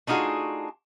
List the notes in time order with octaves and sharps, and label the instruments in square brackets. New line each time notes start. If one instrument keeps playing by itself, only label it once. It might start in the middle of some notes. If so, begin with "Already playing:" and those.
[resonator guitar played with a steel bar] A3 D4 D#4 F4 F#4 G#4